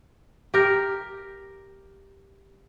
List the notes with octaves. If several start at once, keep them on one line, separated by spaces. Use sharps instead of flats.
G4 A#4